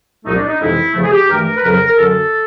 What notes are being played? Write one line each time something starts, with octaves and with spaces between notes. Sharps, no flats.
C2 A#2 F#3 A3 D#4
D4
D#4
F2 C3 E3 G#3 E4
E2 C#3 F3 A3
G#4
G4
G2 E3 A3 A#4
B4
F2 C#3 F#3 A#4
A#4
F#2 D3 F#3 A4